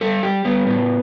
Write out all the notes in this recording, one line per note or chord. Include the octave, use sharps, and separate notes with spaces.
G3 A4
G3 G4
G3 B3
A2 B3